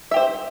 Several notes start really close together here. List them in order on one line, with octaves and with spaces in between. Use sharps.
E5 G4 C5